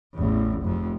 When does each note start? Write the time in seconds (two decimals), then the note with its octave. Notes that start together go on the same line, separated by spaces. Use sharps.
0.15 A1 E2
0.63 F1 F2